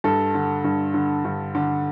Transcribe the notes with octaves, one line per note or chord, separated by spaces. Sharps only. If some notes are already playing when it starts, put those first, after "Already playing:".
G2 A4
D3
G2
D3
G2
D3